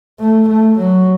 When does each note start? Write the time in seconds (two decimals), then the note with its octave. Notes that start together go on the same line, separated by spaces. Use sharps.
0.20 A3
0.48 A3
0.77 F#3